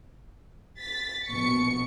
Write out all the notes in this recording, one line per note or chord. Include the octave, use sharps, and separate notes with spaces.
A6 B6
A#1 B2 C#6 C#7